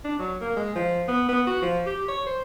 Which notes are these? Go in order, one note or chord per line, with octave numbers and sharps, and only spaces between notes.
D4
F#3
A#3
G#3
F3
B3
B3
F#4
F3
G4
C#5
C5